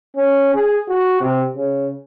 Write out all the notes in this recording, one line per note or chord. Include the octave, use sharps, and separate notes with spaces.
C#4
G#4
F#4
C3
C#3